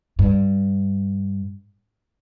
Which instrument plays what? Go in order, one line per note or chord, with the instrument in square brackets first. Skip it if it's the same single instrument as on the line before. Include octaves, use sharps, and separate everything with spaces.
[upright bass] G2